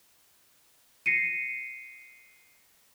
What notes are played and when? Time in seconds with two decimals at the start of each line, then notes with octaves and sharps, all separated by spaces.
1.06 A#6 C7 C#7 D#7